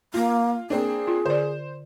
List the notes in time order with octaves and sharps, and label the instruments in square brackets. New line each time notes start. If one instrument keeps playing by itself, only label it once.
[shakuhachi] A#3 [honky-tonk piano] F4
[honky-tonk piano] A#3 C4 D4 [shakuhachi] G#4
[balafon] F4
[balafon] D3 D5 [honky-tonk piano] C5